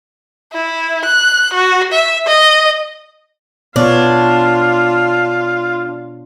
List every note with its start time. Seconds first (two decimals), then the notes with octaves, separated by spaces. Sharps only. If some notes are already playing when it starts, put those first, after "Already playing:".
0.53 E4
1.05 F#6
1.54 F#4
1.92 E5
2.27 D#5
3.76 B2 B3 D4 F4 C#5